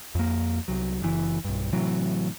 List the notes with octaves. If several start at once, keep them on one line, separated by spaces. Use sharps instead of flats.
F2 A#3
C2 F#3
F#1 E3
B1 G2
A2 C3 E3 F#3